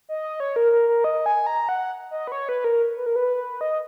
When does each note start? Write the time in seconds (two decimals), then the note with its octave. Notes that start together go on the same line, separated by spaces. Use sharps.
0.09 D#5
0.40 C#5
0.56 A#4
0.72 A#4
0.88 A#4
1.04 D#5
1.26 G#5
1.47 A#5
1.69 F#5
2.11 D#5
2.27 B4
2.32 C#5
2.49 B4
2.64 A#4
2.97 B4
3.06 A#4
3.16 B4
3.61 D#5